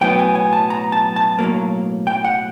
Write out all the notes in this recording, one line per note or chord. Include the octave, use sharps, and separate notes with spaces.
B1 A2 F#3 B3 G5
G#5
G#5
A5
A#5
A5
A5
B1 A2 F#3 A#3
G5
F#5